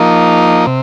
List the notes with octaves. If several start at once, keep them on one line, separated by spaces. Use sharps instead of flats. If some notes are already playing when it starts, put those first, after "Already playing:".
Already playing: F3 A#3 D#4
C3